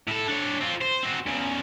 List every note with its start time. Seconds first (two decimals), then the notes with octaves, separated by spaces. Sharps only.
0.08 A2 A4
0.28 D4 C#5
0.61 C4 F4
0.81 C5
1.03 C4 F#4
1.27 E2 C#3